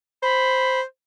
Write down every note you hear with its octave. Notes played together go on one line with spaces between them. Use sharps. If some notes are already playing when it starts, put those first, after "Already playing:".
C5 B5